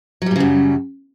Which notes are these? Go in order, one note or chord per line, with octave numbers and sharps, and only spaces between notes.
F#2 A#2 C#3 F#3 G3